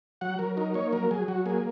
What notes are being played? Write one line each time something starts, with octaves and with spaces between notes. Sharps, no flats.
F#3 F#5
F#3 A#4
D#4 A#4
A#3 C#5
F#3 A#4
F#3 G#4
F#3 F#4
A#3 G#4